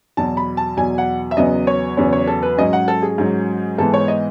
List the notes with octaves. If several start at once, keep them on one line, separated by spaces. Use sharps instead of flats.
E2 B2 F#3 A5
B5
A5
E2 B2 F#3 G#5
F#5
E5
E2 C#3 F#3 B3 D#5
C#5
E2 C#3 F#3 B3 C#5
C#5
A4
B4
G#2 F#3 C#4 D#5
F#5
A4
G#4
G#2 F#3 C#4
G#2 E3 G#3 B3 A4
C#5
D#5